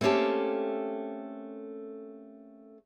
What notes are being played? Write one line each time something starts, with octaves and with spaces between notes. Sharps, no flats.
A3 A#3 C4 C#4 G4 A4